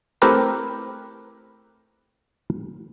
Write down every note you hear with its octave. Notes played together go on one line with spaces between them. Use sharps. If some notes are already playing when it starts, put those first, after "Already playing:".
A3 C4 E4 G4 A#4 B4